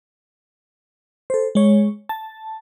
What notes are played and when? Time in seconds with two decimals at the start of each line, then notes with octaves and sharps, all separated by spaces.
1.30 A4 C5
1.55 G#3 C#5
2.09 A5